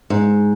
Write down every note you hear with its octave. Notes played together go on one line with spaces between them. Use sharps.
G#2